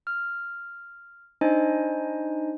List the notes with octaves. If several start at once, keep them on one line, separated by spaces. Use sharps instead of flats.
F6
D4 D#4 C5 D#5 G#5